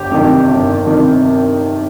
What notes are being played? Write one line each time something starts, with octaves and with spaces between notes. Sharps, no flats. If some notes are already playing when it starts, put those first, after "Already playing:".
Already playing: G1 G4
F2 C3 D#3
G1
C3 D#3